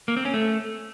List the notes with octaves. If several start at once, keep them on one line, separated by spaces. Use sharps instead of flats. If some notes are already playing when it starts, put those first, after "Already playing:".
A#3
C4
C#4
A3